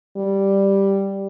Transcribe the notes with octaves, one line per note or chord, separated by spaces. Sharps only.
G3